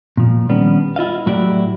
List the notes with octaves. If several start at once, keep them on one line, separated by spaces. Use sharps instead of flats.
A#2 F3
D#3 G3 B3 C#4 D4
E4 F4 D#5 F5
A2 F#3 E4 F#4 G4 D5